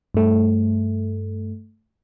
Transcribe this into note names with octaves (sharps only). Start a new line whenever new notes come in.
G2 A3